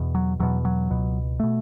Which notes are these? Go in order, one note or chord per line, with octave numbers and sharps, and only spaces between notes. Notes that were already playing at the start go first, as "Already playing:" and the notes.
Already playing: E2 B2
F#3
E2 B2 F#3
F#3
C#2 B2
B2 A3